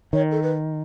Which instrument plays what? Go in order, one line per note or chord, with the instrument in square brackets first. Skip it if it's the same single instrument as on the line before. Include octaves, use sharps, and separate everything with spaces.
[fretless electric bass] D#3 [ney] C#5
[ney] A4
B4